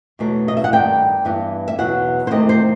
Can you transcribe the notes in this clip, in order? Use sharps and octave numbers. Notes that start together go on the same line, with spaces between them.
E2 B2 F#3 A3
D#5
E5
F#5
G2 D#3 G3 G5
G2 E3 B3
E5
E2 B2 F#3 B3 F#5
C5
E2 C3 D#3 A3 C4 D#5
C5